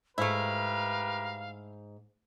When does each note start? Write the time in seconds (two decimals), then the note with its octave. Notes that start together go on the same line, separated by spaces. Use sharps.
0.18 G#2 A3 E4 G4 A#4 B4 F5